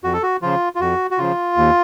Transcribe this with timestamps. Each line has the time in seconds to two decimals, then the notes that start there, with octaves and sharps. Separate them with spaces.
0.04 F2 F#4
0.13 A4
0.23 F#4
0.42 C#3 F3 F4
0.75 F4
0.81 F2 F#4
1.11 F#4
1.18 C#3 F3 F4
1.57 D#2